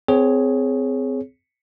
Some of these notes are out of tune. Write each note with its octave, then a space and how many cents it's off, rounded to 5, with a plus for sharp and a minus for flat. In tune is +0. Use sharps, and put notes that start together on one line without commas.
C4 -25 G#4 +15 C#5 +0